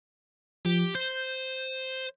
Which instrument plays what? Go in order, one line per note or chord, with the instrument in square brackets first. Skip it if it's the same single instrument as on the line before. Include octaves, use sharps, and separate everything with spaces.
[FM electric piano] F3 [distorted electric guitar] G4
[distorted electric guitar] C5 [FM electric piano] G6